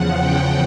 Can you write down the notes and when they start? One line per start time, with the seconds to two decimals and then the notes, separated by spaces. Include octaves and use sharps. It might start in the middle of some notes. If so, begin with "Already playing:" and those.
Already playing: E2 C#3 F3 F#5
0.17 G5